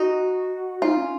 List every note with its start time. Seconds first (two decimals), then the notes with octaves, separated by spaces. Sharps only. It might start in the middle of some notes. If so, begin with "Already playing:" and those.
Already playing: D#4 F#4
0.82 D#4 F4
0.97 C#4